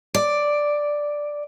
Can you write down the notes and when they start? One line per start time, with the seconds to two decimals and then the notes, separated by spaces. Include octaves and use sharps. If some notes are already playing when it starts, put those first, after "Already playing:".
0.15 D5